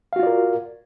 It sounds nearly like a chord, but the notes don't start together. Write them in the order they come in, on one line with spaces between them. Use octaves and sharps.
F5 F#4 F4 D5 A#4